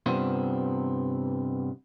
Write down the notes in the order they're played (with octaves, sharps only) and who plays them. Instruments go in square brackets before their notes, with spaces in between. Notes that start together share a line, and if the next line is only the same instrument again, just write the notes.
[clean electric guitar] G2 C3 B3 C4 F4